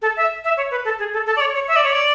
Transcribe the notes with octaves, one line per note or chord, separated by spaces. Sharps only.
A4
E5
E5
C#5
B4
A4
G#4
A4
A4
D5
C#5
C#5
E5
D5
C#5
D5